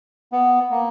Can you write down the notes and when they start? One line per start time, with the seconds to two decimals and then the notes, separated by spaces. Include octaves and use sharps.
0.32 B3
0.71 A#3